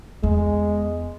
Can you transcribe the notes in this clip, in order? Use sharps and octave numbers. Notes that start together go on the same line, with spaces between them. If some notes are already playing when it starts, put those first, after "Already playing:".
E2 G#3